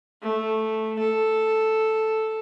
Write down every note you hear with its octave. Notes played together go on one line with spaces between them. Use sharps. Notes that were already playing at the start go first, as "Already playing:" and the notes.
A3
A4